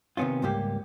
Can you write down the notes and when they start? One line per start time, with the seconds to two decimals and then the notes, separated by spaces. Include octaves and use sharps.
0.17 C3 D#3 B3 C#4 F4
0.42 C#2 G#2 G3 A#3 G4